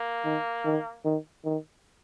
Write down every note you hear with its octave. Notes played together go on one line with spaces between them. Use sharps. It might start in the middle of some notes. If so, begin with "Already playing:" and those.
Already playing: A#3
D#3
D#3
D#3
D#3